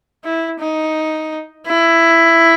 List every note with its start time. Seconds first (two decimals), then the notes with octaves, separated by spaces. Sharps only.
0.24 E4
0.60 D#4
1.67 E4